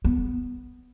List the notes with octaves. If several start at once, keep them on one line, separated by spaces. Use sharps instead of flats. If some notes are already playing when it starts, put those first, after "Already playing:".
B3